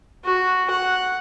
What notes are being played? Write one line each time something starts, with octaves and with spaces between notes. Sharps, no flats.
F#4
F#5